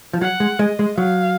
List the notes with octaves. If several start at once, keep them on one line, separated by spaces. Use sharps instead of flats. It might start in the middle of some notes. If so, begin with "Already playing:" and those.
F3
F#3 F#5
G#3
G#3 D#5
G#3
F#3 F5